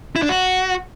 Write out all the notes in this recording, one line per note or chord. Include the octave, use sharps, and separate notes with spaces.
E4
D4
F#4